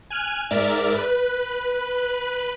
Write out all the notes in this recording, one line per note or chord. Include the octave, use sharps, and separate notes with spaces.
G#5 F6 F#6 D#7
G#2 A#4 D5 E5 F6 A6
B4 F#6